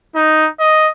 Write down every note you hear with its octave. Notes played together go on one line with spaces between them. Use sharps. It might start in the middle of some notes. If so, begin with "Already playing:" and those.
D#4
D#5